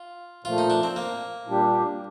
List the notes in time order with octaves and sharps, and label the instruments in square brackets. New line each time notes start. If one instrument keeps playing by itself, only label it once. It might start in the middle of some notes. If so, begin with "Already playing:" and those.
Already playing: [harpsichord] F4
[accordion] A#2 F3 A3 [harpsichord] F4
[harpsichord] D#4
D4
C4
A#3
[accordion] A#2 G3 D4 G4